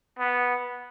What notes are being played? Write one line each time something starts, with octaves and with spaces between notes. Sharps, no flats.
B3